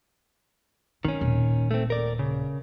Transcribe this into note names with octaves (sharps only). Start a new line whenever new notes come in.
D#3 C4 C#4
D#1 A#2
A3 C4
A#4 D5
C#3